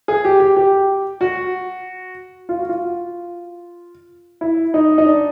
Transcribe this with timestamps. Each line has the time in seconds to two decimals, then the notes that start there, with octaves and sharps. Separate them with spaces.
0.08 G#4
0.25 G4
0.40 G4
0.56 G4
1.21 F#4
2.49 F4
2.59 F#4
2.69 F4
4.41 E4
4.74 D#4
4.98 D#4
5.06 D4